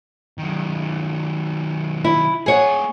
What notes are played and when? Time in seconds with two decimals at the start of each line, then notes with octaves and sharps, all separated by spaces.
0.39 D#3 F#3
2.04 E4
2.46 A#3 G#4 C#5 F#5